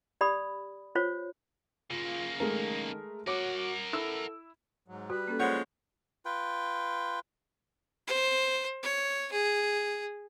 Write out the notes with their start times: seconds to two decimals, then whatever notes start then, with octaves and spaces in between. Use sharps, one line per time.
0.21 G4 D5 B5 D#6
0.95 F4 C5 C#5
1.90 C#3 A#3 F4
2.40 D#3 G#3 A3 A#4
3.27 F#4 A#4 C#5 F#5 D6
3.93 E4 A4 E6
4.88 G#2 F#3
5.10 G3 F#4 B4
5.28 A#3 C#4 A4
5.40 F3 G#3 C#5 F#5
6.25 F4 B4 G5
8.07 C5
8.83 C#5
9.32 G#4